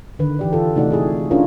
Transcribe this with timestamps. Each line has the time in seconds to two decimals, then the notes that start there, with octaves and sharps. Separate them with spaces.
0.19 D3 D#3 B4
0.39 E3 G4 D5
0.53 F4 A4
0.76 C3 A3 D#4 F#4 D5 F#5
0.90 E4 F#4 G#4
1.31 C#4 D4 E4 F4 A#4 C#5